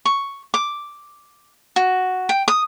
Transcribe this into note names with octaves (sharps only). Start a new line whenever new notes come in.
C#6
D6
F#4
G5
D#6